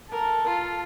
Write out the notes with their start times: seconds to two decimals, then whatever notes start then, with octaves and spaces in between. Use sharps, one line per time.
0.12 A4 A#4
0.46 F4